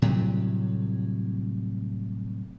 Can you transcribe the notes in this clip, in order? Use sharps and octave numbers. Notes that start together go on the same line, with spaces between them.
A2 C3 F#3 G3